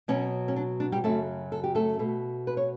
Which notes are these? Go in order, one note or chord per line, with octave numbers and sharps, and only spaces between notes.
B2 F#3 B3 C#4
C#4
D4
D4
G3 G4
F#2 C#3 F#3 A3 A4
A4
G4
A3 A4
B2 A3
B4
C#5